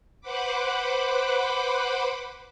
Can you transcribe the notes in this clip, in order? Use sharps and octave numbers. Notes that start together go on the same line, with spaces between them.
B4 C5 F#5 B5 D6